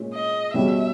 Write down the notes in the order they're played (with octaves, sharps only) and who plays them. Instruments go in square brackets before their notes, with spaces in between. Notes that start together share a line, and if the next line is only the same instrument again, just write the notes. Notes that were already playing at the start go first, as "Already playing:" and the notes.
Already playing: [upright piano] A#2 G#3 C#4
[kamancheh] D#5
[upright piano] B2 G3 C#4 G#4 [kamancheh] E5